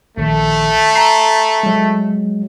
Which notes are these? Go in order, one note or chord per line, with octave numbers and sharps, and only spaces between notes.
A#1 D#3 A3
A#5 C7
F#3 G#3